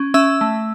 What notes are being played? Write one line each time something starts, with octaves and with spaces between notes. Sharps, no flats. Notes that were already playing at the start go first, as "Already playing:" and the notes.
Already playing: C#4
C#4 E5 E6
A3